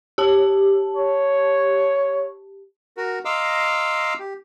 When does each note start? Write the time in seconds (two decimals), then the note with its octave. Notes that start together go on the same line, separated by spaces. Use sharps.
0.18 G4 A5
0.96 C#5
2.97 F#4 A#4
3.25 D#5 F5 A#5 C6 D6 E6
4.19 G4